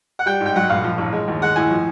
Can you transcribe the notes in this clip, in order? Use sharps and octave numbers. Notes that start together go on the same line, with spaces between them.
F#5
G3 G5
G#2
G5
F#3 F#5
A#1 F5
F3
A1
G#3
D#2
G#3 F#5
A2 G#5
F3